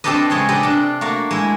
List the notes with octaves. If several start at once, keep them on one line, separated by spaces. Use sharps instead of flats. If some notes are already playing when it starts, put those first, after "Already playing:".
C4 D4 G4 A4 B4 D#5
C#3 G#3 C#5 D#5 C6
G4 A4 B4 D5 D#5
C3 D4
A3 A#3 F#4
G#3 E4